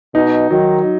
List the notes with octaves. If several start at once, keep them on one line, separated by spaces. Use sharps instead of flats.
B2 D#4
D#3 F#3